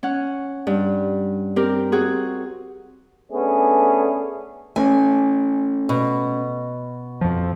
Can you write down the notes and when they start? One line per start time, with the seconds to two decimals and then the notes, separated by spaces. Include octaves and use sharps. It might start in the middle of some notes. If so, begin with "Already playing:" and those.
0.03 C#4 F#5
0.67 G2
1.56 C4 G4 A#4
1.92 C4 F#4 G#4
3.32 A3 B3 C#4 D4 G#4
4.76 A3 C4 C#4 G#5
5.89 B2
7.21 F2 F3